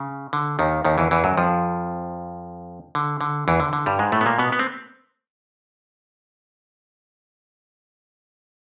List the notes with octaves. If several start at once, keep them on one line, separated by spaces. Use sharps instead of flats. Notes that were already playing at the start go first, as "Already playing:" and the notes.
Already playing: C#3
D3
D#2 D#3
D#2 D#3
E2 E3
E2 E3
F#2 F#3
F2 F3
D3
D3
E2 E3
D3
D3
G2 G3
G#2 G#3
A2 A3
B3
A#2 A#3
B2 B3
B3
C4